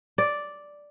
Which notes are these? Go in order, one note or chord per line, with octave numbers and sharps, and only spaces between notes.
D5